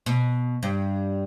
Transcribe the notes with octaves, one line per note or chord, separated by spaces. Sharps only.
B2
G2